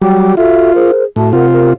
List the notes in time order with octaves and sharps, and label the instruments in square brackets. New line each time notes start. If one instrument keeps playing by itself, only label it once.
[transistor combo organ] F#3 G3 [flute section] G5 D6
[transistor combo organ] F4 [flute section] F#4 A4 E5
[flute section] G#4 A#4 C5
[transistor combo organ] A2 [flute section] F#4 E5 A5
[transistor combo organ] C3 F4 [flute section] A#4 F#5
[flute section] G4 A#4